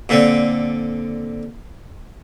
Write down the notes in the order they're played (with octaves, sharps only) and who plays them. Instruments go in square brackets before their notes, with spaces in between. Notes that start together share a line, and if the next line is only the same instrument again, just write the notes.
[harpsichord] A#2 D3 C4